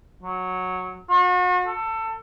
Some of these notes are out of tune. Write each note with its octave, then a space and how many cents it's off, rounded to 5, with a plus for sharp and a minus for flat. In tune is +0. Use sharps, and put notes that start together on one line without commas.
F#3 -10
F#4 -40
A4 +20